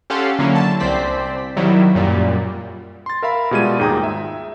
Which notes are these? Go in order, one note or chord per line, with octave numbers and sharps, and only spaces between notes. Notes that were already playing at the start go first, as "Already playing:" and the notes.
C#4 G4 A4 F5 F#5 C6
D3 F#3 A#3 C#4 E4
A5
C2 C4 C5 D5 B6
D#3 F#3 G3 E4
F#2 A#2 G3
C6 A6
A#4 E5 F5 B5
B2 G3 G#3 F4 G#6 D#7
D#2 G#2 G#4 G5 A#5 D#6
E5